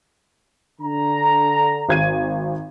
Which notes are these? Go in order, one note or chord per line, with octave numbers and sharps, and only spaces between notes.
D3 A#5
G#1 G#6 D#7